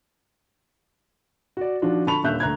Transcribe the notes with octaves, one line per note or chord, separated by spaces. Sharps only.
F#4 D5
D#3 F3 D4 F4 F#4
D3 A5 B5 C#6 F7
D#1 D3 E5 F#6 G6
D2 A#5 F#6 G#6